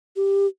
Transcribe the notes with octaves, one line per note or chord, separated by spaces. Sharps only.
G4